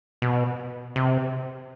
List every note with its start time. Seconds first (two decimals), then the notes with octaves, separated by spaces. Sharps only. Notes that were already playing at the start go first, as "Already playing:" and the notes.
0.22 B2
0.96 C3